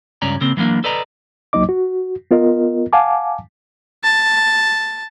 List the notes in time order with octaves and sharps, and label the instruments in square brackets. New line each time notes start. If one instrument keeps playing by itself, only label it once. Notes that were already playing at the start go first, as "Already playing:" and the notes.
[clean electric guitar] C#2 G2 C#4 D5 A#5
C#3 A#3 C4
E3 F#3 G#3 A#3 D4
A4 B4 D5 D#5 A#5
[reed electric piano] C#2 F#3 A#3 D#4 D#5 D6
F#4
B3 F4 A#4 D#5
F5 F#5 G#5 A5 D6
[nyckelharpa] A5